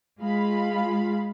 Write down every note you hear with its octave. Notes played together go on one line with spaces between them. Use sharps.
G#3 F4 F5 B5